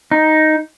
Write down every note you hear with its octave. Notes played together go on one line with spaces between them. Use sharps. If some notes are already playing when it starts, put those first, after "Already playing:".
D#4